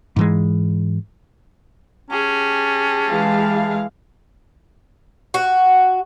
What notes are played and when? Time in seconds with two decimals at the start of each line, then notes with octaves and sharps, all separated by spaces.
0.16 G#2 E3 G#3
2.10 C#4 G4 G#4 A5
3.09 E3 G#3 F5
5.34 F#4